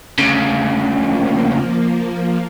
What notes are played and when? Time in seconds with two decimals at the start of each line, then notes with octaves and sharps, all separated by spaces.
0.19 D2 C#3
0.94 F3 A#3